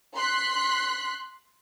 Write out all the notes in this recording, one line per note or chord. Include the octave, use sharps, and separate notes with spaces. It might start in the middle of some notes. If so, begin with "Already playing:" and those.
C6 F#6 B6